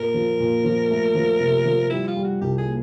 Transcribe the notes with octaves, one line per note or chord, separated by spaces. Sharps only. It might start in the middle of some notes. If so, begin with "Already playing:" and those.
Already playing: A#2 A#4
F3
A#2
F3
A3
F3
C3
F3
G3 E4
F4
G3
F#4
C2 G4
G#4
A#3